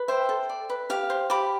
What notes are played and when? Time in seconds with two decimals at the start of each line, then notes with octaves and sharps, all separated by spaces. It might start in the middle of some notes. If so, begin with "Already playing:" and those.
Already playing: B4
0.08 C5 E5 G5
0.29 A4
0.49 D5
0.70 B4
0.90 G4 F5
1.10 C5
1.30 G4 B5 D6